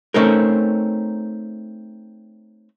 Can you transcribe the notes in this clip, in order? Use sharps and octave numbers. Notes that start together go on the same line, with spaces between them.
A3 C4 C#4 D#4 A#4